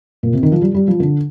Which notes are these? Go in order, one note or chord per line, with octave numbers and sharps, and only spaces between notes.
A#2
C3
D#3
F3
G3
G3
F3
D3